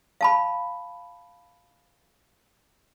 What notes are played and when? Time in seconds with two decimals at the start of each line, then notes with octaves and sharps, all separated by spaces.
0.21 F5 A5 B5